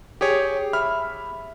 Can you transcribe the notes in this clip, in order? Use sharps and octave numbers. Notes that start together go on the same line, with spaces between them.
G4 G#4 C#5
E5 B5 F6